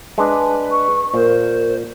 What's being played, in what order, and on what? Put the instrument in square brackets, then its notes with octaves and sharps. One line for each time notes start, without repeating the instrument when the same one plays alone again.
[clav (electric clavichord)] G#3 D4 [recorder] B4
[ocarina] C#6
[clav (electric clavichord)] A#2 [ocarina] A#4 [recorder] C5